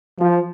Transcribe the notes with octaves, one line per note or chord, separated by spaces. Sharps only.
F3